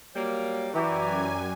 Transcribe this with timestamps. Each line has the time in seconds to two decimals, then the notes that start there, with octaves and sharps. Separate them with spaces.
0.15 F#3 G3 A#3 C#5
0.74 F#2 E3 F#4 G4 D5 G#5 A#5